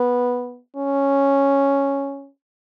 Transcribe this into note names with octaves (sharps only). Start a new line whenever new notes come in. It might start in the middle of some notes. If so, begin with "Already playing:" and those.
Already playing: B3
C#4